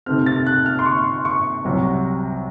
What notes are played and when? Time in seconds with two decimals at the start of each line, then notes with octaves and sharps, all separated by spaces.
0.06 C3 D#3 A3 C4 F6
0.26 A6
0.47 F#6
0.66 F6
0.79 C6
0.86 C#6
1.25 C#6
1.65 C2 C3 F#3